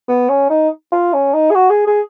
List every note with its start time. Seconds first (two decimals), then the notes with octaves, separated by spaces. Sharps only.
0.08 B3
0.29 C#4
0.50 D#4
0.92 F4
1.13 C#4
1.34 D#4
1.50 G#4
1.55 F#4
1.70 G#4
1.87 G#4